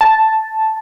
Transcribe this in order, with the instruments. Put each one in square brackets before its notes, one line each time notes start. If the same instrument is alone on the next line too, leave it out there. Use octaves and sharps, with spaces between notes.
[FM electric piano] A5